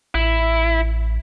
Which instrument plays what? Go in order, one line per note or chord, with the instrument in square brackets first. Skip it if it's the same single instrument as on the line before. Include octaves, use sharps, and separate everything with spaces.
[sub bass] A1 [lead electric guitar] E4